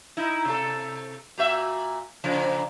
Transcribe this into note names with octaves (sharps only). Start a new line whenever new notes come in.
D#4 E4
C3 A4
A#2 F#4 E5
A#2 C#3 F3